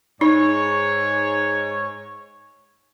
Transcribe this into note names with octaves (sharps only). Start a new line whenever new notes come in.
G#2 D#4 C#5